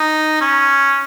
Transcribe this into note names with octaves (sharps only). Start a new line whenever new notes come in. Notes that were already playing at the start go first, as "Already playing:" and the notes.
Already playing: D#4
C#4